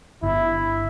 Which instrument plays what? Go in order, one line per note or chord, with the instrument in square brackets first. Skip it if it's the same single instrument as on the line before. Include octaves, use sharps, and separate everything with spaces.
[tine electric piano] G1 [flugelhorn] E4